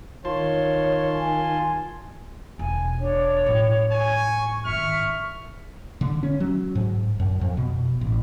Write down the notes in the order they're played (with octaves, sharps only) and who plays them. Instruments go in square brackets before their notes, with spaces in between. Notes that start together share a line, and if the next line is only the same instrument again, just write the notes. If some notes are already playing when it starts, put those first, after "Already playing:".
[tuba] D#3 [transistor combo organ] F4 A5 C6 [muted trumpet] C#5
[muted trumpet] G#5
[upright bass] E1 [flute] G#5
[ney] D4 [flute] C#5
[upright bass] A2 F#3
[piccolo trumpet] G#5 [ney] C#6
[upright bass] G#1 D#3 [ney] E5 [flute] C#6 [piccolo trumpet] F6
[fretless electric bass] D3
C#4
F#3
G#2
F#2
F2
B2
A1